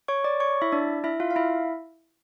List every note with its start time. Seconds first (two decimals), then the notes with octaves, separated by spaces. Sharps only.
0.08 C#5 C#6
0.24 D5 D6
0.40 C#5 C#6
0.62 E4 E5
0.72 D4 D5
1.04 E4 E5
1.20 F4 F5
1.31 F5
1.36 E4 E5